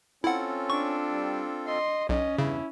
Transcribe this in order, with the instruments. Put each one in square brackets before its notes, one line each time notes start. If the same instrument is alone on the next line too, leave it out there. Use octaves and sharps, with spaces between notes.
[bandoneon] C4 F4 A4 [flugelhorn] C#4 [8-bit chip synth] E4 F#5
[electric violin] D4 [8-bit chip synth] C#6
[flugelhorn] G3
[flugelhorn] D#5 [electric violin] C6
[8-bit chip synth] B1 [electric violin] C#4 [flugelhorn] D#5
[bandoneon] E2 G2 [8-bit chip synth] C#3 [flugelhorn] E4